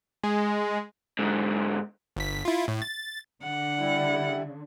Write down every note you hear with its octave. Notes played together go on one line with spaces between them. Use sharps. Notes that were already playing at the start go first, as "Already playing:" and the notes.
G#3
G#2 D3
G1 B6
E4 F4
A2
A6
D3 F#5
G3 E4